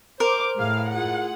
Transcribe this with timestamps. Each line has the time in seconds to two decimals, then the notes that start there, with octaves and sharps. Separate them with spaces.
0.20 A#4 C5 D6
0.58 A2 G#4 F5
0.90 F4 G#4 F#5